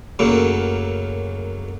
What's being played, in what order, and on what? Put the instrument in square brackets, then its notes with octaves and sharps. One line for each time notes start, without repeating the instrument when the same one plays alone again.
[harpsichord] F#2 C#3 F#3 A3 A#3